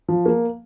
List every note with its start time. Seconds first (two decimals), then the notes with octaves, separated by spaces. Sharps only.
0.08 F3
0.26 A#3